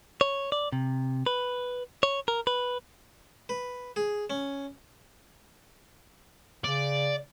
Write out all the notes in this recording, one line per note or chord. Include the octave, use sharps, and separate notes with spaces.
C#5
D5
C3
B4
C#5
A#4
B4
B4
G#4
C#4
C#3 D5